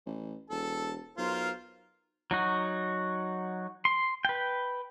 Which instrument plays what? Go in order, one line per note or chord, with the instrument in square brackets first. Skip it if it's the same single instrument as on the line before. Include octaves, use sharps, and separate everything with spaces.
[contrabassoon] A1
[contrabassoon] E1 [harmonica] A4 A5
[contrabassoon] B1 [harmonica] F4 A#4 C5
[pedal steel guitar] F#3 D#4 F#4
C6
B4 G5